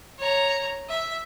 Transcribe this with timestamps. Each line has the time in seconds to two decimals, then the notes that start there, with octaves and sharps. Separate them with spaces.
0.19 C#5 A#5
0.89 E5